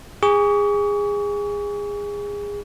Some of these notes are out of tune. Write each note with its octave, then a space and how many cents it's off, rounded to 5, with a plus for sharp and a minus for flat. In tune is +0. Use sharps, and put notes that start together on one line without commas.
G#4 -25 C#6 +35